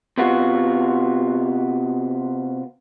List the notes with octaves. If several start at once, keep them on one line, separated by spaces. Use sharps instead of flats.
C3 B3 F4 F#4